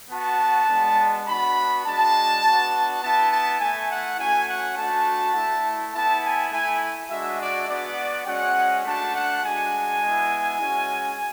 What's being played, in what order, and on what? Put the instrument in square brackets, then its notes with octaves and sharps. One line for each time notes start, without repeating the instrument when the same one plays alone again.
[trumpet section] B3 F#4 A5
G#3 B3 D4
B3 D4 F#4 B5
G#3 D4 F#4 A5
B3 D4 F#4
B3 E4 A5
A5
A3 E4 G#5
F#5
A3 C#4 F#4 G#5
F#5
A3 D4 F#4 A5
A3 E4
B3 E4 A5
G#5
A3 E4 G#5
G#3 D4 F#4 E5
D5
B3 F#4 D5
G#3 C#4 F#4 F#5
A3 D4 F#4 A5
F#5
G#3 D4 F#4 G#5
G#3 B3 E4
G#3 C#4 F#4